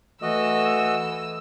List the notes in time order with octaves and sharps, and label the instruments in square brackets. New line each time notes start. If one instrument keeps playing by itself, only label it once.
[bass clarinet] E3 [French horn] A3 [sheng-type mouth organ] F#4 D#5 [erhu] E6